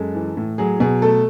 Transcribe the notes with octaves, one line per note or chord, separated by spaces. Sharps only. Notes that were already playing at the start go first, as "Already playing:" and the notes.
Already playing: F#2 G#3 A4
E3
A2
F#3 G#4
B2 G#4
A3 A4